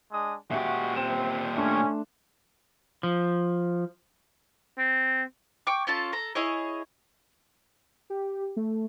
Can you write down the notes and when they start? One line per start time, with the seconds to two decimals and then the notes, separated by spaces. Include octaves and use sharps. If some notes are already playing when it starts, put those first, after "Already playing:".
0.10 G#3 D4 D#6
0.51 A#2 G#3 F#4 G4 E5
0.96 C4 E7
1.57 A3 C#4 D4 C6
3.03 F3
4.79 C4
5.67 G5 C#6 D6
5.87 C#4 F4 A4 A5
6.13 A4 A#5
6.35 E4 G#4 C#5 D#5
8.10 G4
8.57 A3